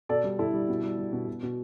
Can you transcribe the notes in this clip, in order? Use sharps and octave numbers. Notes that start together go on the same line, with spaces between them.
B2 A4 D5
G3
B2 E4 A4
G3
B2
G3
G3
B2
B2
B2